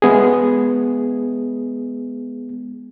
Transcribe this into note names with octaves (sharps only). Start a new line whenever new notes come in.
G#3 B3 G#4